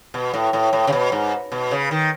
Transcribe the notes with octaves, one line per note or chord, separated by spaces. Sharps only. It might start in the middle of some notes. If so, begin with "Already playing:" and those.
B2
A2
A2
A2
C#3
B2
G#2
B2
C#3
D#3